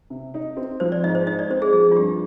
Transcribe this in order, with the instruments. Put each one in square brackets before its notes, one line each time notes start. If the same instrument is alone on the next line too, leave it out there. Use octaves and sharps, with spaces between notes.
[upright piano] C3
D#4
C4
[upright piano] F3 [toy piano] C5
[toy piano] D5
[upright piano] G#2 [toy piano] D#5
[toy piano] C5
[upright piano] D#4 [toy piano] D#5
[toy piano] D5
[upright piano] C4 [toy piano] C5
[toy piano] G#4
[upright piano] F3 [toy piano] G#4
[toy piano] F4
[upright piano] G2 [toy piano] G4